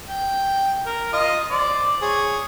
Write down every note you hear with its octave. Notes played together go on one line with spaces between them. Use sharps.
G5
A#4
F4 D#5
C5 D5
G#4 C#5